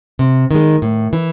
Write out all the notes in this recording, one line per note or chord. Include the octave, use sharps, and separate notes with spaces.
C3
D#3 G#3
A2
E3